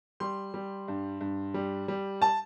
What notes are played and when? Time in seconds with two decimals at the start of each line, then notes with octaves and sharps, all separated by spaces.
0.20 G3 C6
0.54 G3
0.88 G2
1.21 G2
1.54 G3
1.88 G3
2.22 A5